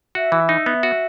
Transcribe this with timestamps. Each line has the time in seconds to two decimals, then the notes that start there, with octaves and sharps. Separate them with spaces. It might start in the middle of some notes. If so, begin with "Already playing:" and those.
0.15 F#4 E5
0.32 E3
0.49 D#4
0.66 B3
0.83 F#4